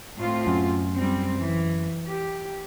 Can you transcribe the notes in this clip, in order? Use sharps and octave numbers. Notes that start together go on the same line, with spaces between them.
A2 C4 F4
F#2
G3 C4
E3
G4